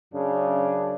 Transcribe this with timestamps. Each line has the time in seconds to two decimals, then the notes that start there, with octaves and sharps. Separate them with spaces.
0.14 F#2 C#3 D4